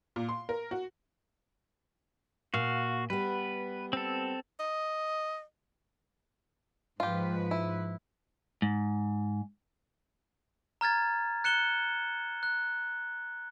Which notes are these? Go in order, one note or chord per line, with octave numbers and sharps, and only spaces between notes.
A#2
C6
A#4
F#4
A#2 F#4 F5
G3 B3 B4
C4 A4
D#5
G#2 F3 F4 G4 B4
E4
G#2
A#5 F6 G#6 A6
F#6 C#7 E7 G7
F#6